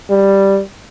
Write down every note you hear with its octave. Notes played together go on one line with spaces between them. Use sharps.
G3